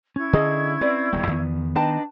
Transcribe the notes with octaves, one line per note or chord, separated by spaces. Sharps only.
C#4 E4 C#6 G#6
D3 G#4 D#5
C4 B4 D5
D1 D#3 G3 B3 G5
E2 D#3 B3
D4 D#4 B4 D#5 G5 A5